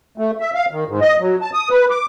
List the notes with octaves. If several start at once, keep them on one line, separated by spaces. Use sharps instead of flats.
A3
E5
F5
D#3
G#2
D#5
F#3
A5
D#6
B4
D6